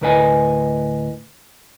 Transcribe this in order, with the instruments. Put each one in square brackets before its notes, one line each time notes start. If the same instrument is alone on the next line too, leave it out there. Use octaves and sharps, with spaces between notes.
[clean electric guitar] D2 A2 A#4 B4 D#5 G#5